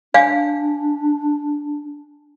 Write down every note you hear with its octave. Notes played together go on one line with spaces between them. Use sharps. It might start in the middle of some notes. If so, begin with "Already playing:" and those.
D4 F5 G#5